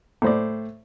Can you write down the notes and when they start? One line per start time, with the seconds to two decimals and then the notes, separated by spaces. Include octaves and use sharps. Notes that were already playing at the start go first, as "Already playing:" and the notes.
0.22 A2 C5 D5